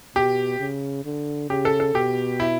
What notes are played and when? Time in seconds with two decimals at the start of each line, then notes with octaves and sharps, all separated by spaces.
0.16 B2 G4
0.60 C#3
1.05 D3
1.49 C#3 G4
1.65 A4
1.80 A4
1.94 B2 G4
2.40 E4